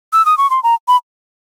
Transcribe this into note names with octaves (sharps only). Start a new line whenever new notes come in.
E6
D#6
C#6
C6
A#5
B5